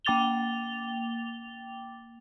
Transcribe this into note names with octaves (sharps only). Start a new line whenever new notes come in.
A#3 G5 D6 A6 F7 G7